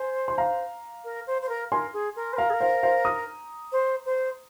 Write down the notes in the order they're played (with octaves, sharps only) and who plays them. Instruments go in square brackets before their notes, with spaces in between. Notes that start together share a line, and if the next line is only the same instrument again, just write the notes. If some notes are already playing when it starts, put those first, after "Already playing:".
Already playing: [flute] C5 [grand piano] G#5
[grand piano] C6
F5 A#5
[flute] A#4
C5
C5
A#4
[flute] A#4 [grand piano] G#5 C6
[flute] G#4
A#4
C5
[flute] A#4 [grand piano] F5 A#5
[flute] G#4
A#4
[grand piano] C5 F5
C5 F5
A#5 D#6
[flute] C5
C5